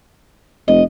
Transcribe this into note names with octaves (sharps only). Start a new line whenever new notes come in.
F1 D#5